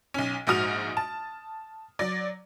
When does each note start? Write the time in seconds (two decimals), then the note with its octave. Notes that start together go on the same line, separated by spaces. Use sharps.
0.14 B1 C#4
0.47 A#1 G#2 F#4 D#6 F6 F7
0.97 A5
1.99 F#3 D5